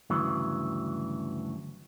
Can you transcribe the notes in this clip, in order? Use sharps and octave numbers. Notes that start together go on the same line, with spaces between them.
D2 G2 C#3 E3 F#3